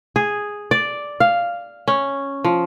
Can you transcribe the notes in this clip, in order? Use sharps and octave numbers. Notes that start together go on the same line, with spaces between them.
G#4
D5
F5
C#4
F3